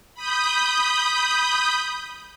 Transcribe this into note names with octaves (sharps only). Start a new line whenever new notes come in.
B5 D#6 G6